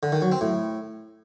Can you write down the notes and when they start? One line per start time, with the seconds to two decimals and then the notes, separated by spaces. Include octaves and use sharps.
0.03 D3
0.12 D#3
0.22 F#3
0.32 C4
0.41 A2